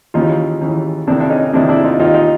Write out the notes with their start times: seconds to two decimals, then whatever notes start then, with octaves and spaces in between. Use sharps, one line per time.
0.14 D#2 C#3 E3 D#4 F4
0.61 D#2 C#3 E3
1.07 F2 C3 D#3 D4 E4
1.20 D4
1.30 C#4 D#4
1.44 D#4
1.53 F2 C3 D#3 D4 E4
1.69 D4 E4
1.84 D#4 F4
2.00 D#2 D#3 D#4 F4
2.15 D#4 F4